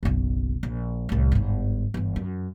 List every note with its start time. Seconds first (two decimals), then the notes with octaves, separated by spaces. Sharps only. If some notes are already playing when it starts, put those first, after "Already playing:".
0.03 F#1 B1
0.63 A#1
1.09 C2 A2
1.32 G1 G#2
1.94 G1 E3
2.16 F#2